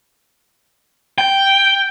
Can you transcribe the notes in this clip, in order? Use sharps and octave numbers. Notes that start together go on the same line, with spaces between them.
G5